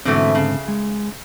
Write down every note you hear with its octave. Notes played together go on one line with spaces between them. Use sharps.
G#2 B2 D3 E3 A3 C4
C#3
G#3